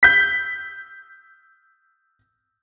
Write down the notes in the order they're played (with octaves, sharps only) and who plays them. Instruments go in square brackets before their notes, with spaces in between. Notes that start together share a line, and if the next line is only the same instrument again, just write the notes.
[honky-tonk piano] G6 B6